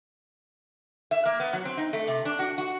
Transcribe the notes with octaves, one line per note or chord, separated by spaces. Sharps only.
E5
A#3
B3
F#3
C4
D#4
A3
C3
D4
F#4
F#4